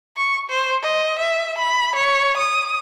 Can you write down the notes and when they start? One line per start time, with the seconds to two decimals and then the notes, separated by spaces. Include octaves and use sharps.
0.17 C#6
0.50 C5
0.82 D#5
1.19 E5
1.58 B5
1.95 C#5
2.37 D#6